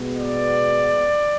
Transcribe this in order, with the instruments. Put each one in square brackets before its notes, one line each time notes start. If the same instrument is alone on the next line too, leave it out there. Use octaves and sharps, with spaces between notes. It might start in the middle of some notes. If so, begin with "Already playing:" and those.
Already playing: [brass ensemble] B2 G#3 B3
D5